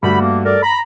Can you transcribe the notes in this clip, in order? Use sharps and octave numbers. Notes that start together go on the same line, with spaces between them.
G2 D3 A3 F#4 G4 B5
A#3
A4 A#4 D5
A#5 B5